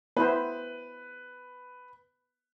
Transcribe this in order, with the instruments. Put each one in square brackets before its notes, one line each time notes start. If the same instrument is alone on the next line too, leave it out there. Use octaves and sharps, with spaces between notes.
[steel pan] B3 E4 C5 [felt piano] B4